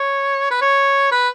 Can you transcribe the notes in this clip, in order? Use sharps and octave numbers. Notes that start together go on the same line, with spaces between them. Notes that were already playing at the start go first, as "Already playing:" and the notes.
Already playing: C#5
B4
C#5
B4